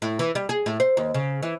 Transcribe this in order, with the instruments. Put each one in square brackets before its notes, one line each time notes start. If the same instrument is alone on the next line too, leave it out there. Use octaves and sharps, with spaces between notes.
[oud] A2
E3
G3
G#4
A2
C5
D#2
C#3
E3